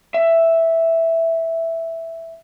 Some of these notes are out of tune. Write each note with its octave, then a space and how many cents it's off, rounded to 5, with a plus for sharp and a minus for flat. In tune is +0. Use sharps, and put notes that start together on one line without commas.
E5 +0